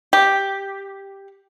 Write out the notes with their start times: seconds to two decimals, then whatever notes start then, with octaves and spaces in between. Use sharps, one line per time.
0.13 G4